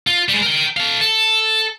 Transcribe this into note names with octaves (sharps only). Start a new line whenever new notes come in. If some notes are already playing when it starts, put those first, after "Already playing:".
F4
G3 G#3
A#4 G5
A4 F5
A4